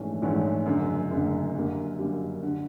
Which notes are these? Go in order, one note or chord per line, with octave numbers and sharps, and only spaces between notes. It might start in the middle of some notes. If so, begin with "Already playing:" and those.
Already playing: A#1 G#2 E3 A3 C#4
A#1 G#2 E3 A3 C#4
F#1 F#2 D3
F#1 F#2 D3
F#2 D3 G3 A#3
F#2 D3 G3 A#3
D3